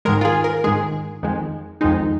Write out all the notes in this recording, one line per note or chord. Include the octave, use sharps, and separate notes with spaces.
G#2 D#3 G#3 A#4
F4
G#4
A#4
G#2 D#3 G#3 G#4
F2 D#3 G#3
F2 D#3 G#3 D#4